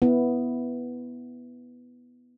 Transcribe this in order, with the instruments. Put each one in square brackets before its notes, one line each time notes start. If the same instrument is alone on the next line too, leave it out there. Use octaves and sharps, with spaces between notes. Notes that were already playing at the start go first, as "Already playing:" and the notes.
[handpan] B3 E4